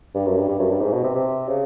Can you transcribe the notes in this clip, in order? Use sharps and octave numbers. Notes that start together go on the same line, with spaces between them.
G2
F#2
G2
G2
F#2
G2
G#2
B2
C3
C3
C#3